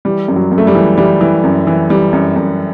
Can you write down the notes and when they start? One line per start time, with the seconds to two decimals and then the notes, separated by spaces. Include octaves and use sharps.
0.05 E3 G3
0.28 F#2
0.36 F#3
0.52 F#2
0.58 A3
0.67 G3
0.75 E3
0.98 E3 G3
1.21 E3
1.44 F#2
1.67 E3
1.90 E3 G3
2.13 F#2
2.36 F#2